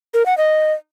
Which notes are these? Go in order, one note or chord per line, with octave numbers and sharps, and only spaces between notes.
A#4
F#5
D#5